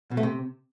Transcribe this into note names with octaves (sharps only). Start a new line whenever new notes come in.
B2
A3
C3